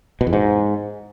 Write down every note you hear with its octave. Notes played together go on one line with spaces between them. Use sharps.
B2
E2
G#2